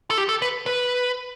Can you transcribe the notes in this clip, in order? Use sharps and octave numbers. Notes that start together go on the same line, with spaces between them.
A4
G4
A4
B4
B4